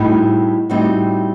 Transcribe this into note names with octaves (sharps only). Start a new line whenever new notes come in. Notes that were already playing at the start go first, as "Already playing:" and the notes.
Already playing: A2 G3 C4 D#4 F#4
A2 G3 C4 D#4 F#4